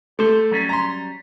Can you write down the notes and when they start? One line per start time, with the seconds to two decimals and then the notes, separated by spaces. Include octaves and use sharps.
0.19 A3 G4 C6
0.51 F#3 G3 C#4
0.69 A#5 C6